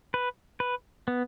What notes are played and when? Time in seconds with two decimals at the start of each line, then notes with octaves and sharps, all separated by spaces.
0.14 B4
0.60 B4
1.08 B3